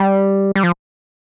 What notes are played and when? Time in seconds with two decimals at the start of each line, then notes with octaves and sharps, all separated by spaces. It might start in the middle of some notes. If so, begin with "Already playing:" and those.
Already playing: G3
0.55 G3
0.63 F3